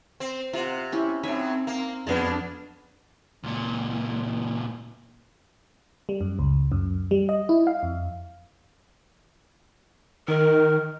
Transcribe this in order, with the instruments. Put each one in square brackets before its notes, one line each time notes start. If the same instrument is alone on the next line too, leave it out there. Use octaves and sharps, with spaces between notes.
[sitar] C4
[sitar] C3 [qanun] F4 F#5
[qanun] C#4 E4 G4
[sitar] A2 F#3 [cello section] C4 [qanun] D#4 G#5 B5
[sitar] A#3
[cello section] F2 D4 [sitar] B2 G#3 [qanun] B3 D5
[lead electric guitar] C#2 A#2
[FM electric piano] G3
F#2
C#2
F#2
G3
D#5
E4
F5
F2
[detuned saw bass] D#3 [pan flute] A#4